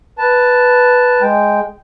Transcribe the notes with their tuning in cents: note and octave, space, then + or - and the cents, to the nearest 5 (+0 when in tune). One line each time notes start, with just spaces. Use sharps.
B4 +0 A5 +0
G#3 +0 G5 +0